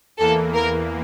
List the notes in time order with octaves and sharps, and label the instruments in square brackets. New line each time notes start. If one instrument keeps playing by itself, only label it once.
[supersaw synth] E2 E3 A#3 [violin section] A4
[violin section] A#4